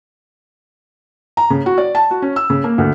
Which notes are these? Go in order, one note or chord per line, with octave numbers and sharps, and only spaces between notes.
A#5
C#3
F#4
D5
A5
F#4
C#4
E6
C#3
A#3
D2